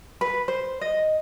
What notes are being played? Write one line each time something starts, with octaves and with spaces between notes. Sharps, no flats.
B4
C5
D#5